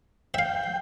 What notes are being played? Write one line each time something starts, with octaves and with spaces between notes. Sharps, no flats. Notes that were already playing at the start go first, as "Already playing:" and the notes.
E5 F5 G5